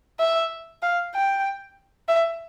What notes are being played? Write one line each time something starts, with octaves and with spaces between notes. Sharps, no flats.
E5
F5
G5
E5